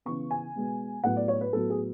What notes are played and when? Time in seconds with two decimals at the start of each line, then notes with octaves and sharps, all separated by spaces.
0.06 C#3 E3 B3 C#6
0.31 G#5
0.56 B2 G#3 B3
1.04 A2 F#3 B3 F#5
1.16 D5
1.28 C#5
1.41 B4
1.53 A2 F#3 B3 A4
1.70 G#4